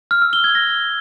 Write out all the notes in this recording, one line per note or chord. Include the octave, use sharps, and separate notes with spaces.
F6
E6
G7
G#6
A#6